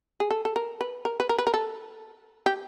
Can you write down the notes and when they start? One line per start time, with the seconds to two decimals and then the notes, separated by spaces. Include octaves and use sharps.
0.20 G#4
0.30 A4
0.45 A4
0.56 A#4
0.81 B4
1.05 A#4
1.20 B4
1.29 A#4
1.38 B4
1.47 A#4
1.54 A4
2.46 G4